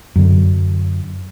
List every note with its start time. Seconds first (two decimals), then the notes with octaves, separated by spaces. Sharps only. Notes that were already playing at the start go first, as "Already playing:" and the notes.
0.16 F#2 D3